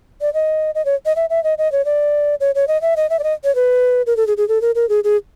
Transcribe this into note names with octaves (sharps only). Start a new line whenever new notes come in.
D5
D#5
D#5
C#5
D#5
E5
E5
D#5
D#5
C#5
D5
C#5
C#5
D#5
E5
D#5
E5
D5
D#5
C#5
B4
A#4
A4
G#4
G#4
A4
A#4
A#4
G#4
G#4